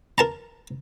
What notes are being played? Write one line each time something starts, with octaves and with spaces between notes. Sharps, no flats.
A#4 A5 A#5